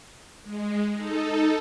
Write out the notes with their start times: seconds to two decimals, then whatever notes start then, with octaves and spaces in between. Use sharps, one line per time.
0.44 G#3
0.93 D#4 A4